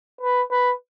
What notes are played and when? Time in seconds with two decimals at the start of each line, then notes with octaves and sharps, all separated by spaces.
0.21 B4
0.51 B4